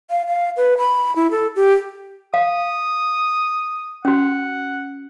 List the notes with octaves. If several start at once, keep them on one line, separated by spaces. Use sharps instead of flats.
F5
F5
B4
B5
E4
A4
G4
F5 D#6
C#4 F#4 F#5